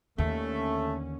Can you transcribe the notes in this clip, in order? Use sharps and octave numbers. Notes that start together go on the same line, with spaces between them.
D#2 D3 A3 C#4